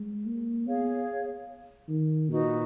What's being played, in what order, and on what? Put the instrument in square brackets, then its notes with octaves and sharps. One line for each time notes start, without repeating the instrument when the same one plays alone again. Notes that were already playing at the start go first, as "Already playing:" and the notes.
Already playing: [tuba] G#3
A#3
[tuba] B3 [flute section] G#4 C#5 F5
[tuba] D#3
[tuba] A#2 [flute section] D#4 F#4 B4